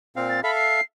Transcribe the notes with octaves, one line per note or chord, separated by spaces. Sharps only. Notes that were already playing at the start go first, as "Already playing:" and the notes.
A#2 C4 F5
A6
A4 E5 F5 B5
C7